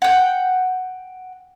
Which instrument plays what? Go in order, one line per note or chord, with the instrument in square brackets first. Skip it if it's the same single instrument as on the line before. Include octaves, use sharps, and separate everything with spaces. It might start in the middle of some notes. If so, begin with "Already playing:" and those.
[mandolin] F#5 G5